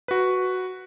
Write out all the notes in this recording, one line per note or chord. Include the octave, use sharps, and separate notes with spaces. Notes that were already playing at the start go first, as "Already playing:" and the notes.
F#4 B4